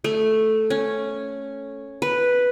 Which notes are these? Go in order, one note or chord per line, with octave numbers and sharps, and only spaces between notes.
A3
C#4
B4